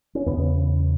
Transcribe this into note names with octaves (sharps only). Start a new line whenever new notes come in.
C#4
E2 C#3 B3